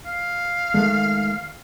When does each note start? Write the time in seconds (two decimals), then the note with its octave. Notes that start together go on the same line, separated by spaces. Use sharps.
0.06 F5
0.74 D#3 G#3 A3